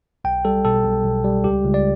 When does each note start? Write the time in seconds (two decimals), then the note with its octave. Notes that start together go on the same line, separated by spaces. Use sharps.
0.24 B1 G5
0.45 G3 A4
0.65 B2 A4
0.85 B1
1.04 B1
1.24 G3
1.44 C#2 G4
1.65 C#2
1.74 D5